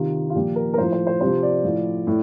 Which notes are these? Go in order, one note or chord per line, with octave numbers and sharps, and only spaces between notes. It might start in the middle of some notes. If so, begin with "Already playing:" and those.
Already playing: C3 D#3 F4
F4
A#2 F3 G4
A#4
A#4
A2 F3 C5
C5
C5
C3 F3 C5
D5
A2 F3
A2